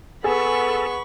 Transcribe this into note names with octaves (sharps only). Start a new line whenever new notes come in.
B3 G#4 A4 B5 C#6